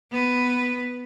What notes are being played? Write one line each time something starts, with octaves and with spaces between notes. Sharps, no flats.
B3 B4